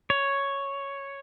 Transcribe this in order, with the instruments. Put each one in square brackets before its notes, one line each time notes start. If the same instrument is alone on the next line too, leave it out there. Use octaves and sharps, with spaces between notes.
[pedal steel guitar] C#5